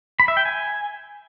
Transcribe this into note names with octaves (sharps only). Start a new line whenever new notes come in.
B5
E5
G5
G#5